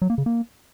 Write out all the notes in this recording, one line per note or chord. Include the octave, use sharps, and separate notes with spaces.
F#3
A#3
C#3
A#3